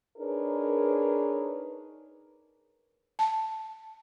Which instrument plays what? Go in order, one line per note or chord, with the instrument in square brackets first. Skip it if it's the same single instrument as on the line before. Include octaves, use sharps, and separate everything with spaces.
[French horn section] D4 D#4 G#4 A#4 B4 C#5
[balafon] A5